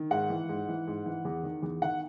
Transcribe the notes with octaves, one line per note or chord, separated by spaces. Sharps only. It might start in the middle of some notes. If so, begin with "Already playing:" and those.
Already playing: D#3
G#2 F#5
E3
G#2
E3
G#2
E3
E2
D#3
E2
D#3 F#5